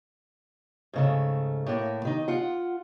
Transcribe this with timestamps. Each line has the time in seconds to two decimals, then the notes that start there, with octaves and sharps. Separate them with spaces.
0.93 G#2 C#3 A3
1.66 A2 A#3
2.05 D#3 D#4
2.28 F4 F#5